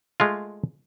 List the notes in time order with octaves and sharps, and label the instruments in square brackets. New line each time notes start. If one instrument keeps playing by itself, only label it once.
[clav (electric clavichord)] G#3 A3 F4